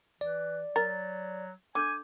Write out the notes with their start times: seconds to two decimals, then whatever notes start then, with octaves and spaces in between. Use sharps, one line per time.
0.21 E3 D5
0.76 F#3 A#4 A6
1.75 D3 G#5 D6 G6